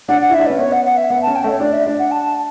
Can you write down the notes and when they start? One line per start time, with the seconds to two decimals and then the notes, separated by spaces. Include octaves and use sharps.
0.08 D4 F#5
0.21 F#5
0.30 E4 E5
0.39 D4
0.46 C#4 B4
0.59 B3 C#5
0.72 F#5
0.85 F#5
0.97 E5
1.10 B3 F#5
1.22 A5
1.27 C#4
1.35 G5
1.44 A3 C#5
1.60 D4 D5
1.73 E5
1.86 D4
1.99 F#5
2.11 A5